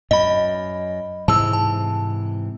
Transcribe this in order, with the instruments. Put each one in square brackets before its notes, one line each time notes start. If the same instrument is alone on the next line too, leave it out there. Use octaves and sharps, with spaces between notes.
[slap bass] F#2 [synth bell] D#5 B5
[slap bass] G#2 C3 E3 [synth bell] A5 E6
[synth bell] A5